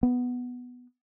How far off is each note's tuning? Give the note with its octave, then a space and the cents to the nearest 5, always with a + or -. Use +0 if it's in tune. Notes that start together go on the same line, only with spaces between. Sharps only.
B3 +0